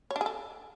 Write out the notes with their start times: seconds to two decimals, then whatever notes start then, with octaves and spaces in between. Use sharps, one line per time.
0.11 C#5
0.16 D4
0.21 G#4
0.26 A4